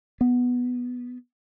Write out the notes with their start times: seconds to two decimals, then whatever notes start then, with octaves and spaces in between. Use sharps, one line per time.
0.21 B3